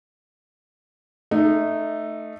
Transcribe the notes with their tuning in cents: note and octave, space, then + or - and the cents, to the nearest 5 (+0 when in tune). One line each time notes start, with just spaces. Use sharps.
A3 +0 D#4 -15